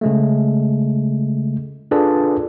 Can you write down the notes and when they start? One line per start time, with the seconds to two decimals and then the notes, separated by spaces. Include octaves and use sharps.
0.01 C#3 G#3 A3
1.91 D4 F4 G#4 A4 B4 D5